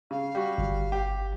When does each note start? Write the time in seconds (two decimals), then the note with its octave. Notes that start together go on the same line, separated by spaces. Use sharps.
0.11 C#3 F5
0.35 G3 F#4
0.58 G1
0.92 G4